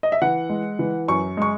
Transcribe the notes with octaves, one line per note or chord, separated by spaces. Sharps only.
D#5
E5
E3 F#5
G#3
E3
F#2 C#6
G#3 C#6